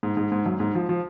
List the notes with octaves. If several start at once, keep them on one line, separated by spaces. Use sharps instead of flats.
G#2
G#2
G#2
F#2
G#2
F3
F3